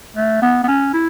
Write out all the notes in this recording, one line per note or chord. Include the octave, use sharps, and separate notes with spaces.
A3
B3
B3
C#4
E4